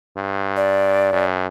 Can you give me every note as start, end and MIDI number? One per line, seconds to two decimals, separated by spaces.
0.17 1.11 43
0.57 1.25 74
1.13 1.47 42